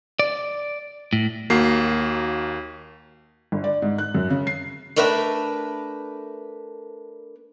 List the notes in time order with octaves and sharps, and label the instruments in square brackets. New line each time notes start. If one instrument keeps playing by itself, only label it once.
[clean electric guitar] D5
A2
[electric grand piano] D#2 A#3 F#4 C7
[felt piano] G1
D5
G#2
F#6
F#2
C#3
C7
[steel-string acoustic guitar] A3 D4 A#4 B4 E5